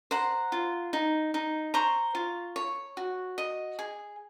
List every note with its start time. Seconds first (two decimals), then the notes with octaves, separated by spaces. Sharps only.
0.11 C5 F#5 A#5
0.52 F4
0.93 D#4
1.34 D#4
1.74 C5 A#5 C#6
2.15 F4
2.56 C#5
2.97 F#4
3.38 D#5
3.79 G#4